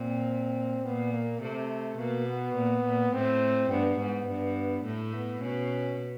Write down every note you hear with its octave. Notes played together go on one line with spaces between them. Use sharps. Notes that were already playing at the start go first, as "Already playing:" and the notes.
Already playing: A#2 C4
A#2 B3
A#3
C3 A3
B2 A#3
B3
A#2
A#2
A2 C4
G2 B3
G#2
G2
A2 A3
B3
B2 C#4